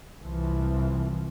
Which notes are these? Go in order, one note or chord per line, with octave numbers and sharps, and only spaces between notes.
C2 E3 F3